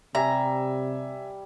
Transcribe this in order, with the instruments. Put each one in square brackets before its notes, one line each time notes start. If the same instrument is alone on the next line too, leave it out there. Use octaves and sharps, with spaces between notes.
[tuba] C3 [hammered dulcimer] G3 [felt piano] E5 G#5 [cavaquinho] A#5